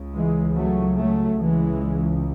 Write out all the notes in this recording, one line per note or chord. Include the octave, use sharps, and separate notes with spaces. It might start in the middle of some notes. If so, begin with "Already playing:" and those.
Already playing: C#2 C#3
E3 G#3
F#3 A3
F#3 A3
C#2 C#3 E3 G#3